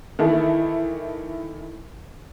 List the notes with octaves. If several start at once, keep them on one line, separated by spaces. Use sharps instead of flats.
D#3 E3 E4 A4